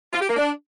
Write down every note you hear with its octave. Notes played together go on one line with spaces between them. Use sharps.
F4
G4
A#3
D4